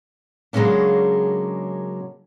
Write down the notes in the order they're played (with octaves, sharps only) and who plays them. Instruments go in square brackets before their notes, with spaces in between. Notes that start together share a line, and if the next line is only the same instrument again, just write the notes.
[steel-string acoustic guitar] C#3 F#3 G#3 A#3 C#4 D4